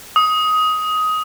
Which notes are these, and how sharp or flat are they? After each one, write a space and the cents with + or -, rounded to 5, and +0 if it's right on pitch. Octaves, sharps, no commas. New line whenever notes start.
D#6 +15